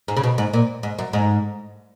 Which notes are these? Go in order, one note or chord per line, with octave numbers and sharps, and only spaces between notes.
G#2
C#3
B2
G#2
A#2
G#2
F#2
G#2